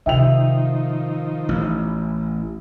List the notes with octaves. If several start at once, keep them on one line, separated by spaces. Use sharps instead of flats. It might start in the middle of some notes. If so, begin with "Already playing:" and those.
C3 D#3 F3 D#4 F4 E5 G5 F7
A1